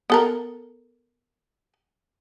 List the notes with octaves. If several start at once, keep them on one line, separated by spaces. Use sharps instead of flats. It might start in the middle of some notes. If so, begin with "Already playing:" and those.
B3 A4 A#4